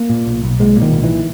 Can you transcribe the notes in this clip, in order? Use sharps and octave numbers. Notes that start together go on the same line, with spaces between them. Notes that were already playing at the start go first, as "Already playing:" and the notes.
Already playing: A#3
A#2
B1
B1
A#2 G#3
A#2
D#3
B1
E3